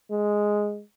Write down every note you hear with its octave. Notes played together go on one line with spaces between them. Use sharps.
G#3